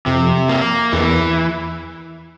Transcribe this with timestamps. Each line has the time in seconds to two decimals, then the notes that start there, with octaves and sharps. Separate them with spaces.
0.06 F2 C3
0.49 A#3
0.92 E2 E3